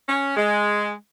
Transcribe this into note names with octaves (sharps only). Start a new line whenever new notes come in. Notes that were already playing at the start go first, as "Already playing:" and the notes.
C#4
G#3